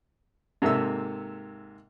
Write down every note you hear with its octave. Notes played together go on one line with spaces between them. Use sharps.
G#2 C3 A#3 A4 E5 E6